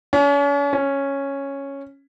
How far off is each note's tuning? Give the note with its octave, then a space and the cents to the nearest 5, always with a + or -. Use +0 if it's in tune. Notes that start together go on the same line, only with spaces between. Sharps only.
C#4 +40
C#4 -5